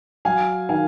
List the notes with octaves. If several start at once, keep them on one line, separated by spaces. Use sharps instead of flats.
F#3 F5 G#5
D#3 F5 G#5